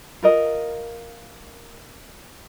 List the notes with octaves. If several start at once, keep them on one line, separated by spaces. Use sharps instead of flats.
F4 A#4 D#5